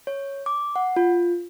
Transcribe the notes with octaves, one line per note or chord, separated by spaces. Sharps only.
C#5
D6
F#5
F4